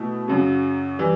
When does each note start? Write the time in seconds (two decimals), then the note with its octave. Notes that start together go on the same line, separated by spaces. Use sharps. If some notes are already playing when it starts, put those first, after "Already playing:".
Already playing: B2 A3 E4
0.28 F#2 C#3 F#3
0.99 E3 G3